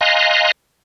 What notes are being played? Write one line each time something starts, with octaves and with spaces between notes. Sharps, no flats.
D#5 F5 G#5 A#5 C6 F#6